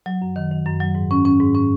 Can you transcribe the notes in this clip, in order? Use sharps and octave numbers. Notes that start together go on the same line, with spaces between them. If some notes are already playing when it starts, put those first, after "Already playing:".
F#3
F#2
D#3
D#3
F#2
F#3
G#2
C#4
C#4
G#2
C#4